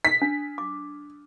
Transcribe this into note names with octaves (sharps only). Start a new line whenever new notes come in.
B6
D4
D6